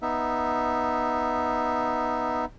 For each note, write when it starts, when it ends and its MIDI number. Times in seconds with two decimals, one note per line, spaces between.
0.02 2.45 59
0.02 2.45 63
0.02 2.45 76